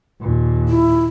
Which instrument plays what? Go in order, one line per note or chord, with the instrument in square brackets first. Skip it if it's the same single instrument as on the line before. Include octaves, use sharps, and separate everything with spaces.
[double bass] D#2 A#2
[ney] E4